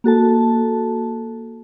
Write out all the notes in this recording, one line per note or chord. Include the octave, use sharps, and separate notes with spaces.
A#3 F#4 A4 A5